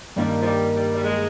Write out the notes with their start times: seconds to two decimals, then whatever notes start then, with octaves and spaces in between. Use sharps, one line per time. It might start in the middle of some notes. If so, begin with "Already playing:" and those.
0.16 G2 D#3 G3 A#3
0.41 F3
0.45 G3
0.74 G3
0.95 G3
1.03 G#3